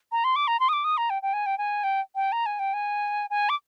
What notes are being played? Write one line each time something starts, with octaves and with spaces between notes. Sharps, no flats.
A#5
C6
D6
A#5
C6
D#6
D6
D#6
A#5
G5
G5
G#5
G5
G#5
G5
G5
A#5
G#5
G5
G#5
G#5
D6